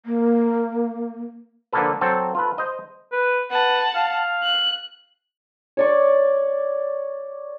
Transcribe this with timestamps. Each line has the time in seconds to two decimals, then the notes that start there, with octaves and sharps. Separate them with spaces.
0.06 A#3
1.73 D3 F3 A#3 F4 A4 B4
2.01 F#3 C4 A4 C5
2.35 F4 A4 B4
2.58 C5 D#5
3.12 B4
3.51 B4 F#5 A5
3.95 F5
4.43 F#6
5.77 C#5 D5 C#6